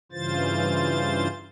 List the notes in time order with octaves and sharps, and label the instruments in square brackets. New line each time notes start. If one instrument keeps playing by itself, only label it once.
[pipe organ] G2 C#3 E3 F4 C5 A6